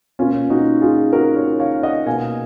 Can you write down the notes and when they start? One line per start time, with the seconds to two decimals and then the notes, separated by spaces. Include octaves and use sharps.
0.19 B2 A#3 C#4 F4
0.50 D#4 F#4
0.82 F4 G#4
1.13 F#4 A#4
1.36 A#4 C#5
1.60 C#5 F5
1.83 D#5 F#5
2.06 B2 A#3 F5 G#5